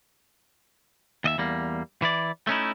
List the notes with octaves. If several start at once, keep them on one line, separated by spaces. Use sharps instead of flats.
D#2 D#5 E5
E2 G3 A#3
E3 E4 D5
A3 C#4 D#4 E4